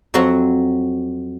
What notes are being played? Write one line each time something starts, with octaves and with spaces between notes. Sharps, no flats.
F2 F#3 C4 F#4 F5